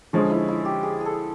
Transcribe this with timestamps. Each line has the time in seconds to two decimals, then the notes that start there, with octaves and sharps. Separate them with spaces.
0.13 D3 F3 G#3 C#4
0.30 E4
0.48 E4
0.65 G4
0.83 G#4
1.01 G#4 A4